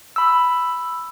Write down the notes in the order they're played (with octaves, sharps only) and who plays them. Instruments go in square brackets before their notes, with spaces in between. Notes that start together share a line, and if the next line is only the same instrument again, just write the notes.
[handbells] B5 E6